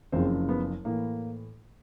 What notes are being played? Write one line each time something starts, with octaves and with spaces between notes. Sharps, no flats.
F#1 F#2 C#3 F3 C4
B3
A2 E3 A#3